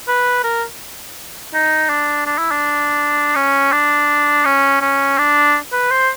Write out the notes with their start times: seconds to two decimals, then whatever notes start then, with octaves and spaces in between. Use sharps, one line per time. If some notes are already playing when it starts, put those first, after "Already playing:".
0.08 B4
0.44 A#4
1.54 D#4
1.89 D4
2.26 D4
2.38 E4
2.51 D4
3.35 C#4
3.72 D4
4.45 C#4
4.81 C#4
5.18 D4
5.72 B4
5.91 C5